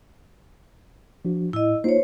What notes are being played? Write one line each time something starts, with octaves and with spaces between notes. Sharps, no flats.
F3 D4 F#4
A2 E4 D#5
A#3 D#4 F4 C5 C#5